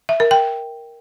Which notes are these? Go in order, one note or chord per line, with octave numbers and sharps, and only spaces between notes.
E5
A#4
G5